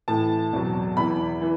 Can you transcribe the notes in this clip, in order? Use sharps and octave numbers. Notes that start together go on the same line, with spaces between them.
A2 E3 A5
E2 B2 F#3
E2 E3 B5
E3